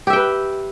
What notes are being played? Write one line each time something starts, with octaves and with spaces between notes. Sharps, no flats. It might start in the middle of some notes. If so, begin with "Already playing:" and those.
G4 B4 E5 G5